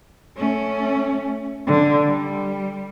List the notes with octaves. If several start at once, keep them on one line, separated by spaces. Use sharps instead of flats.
A3 C#4
D3
G3